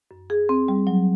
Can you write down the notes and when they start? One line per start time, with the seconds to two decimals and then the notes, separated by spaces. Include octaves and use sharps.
0.11 F#2
0.30 G#4
0.49 C4
0.68 G3
0.87 F#3